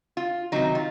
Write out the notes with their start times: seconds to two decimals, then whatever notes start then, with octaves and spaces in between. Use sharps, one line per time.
0.17 F4
0.52 C3 D#3 F#3 D#4
0.75 F4